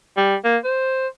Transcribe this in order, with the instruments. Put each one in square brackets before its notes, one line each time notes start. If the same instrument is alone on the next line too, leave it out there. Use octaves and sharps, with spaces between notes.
[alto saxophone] G3
A#3
C5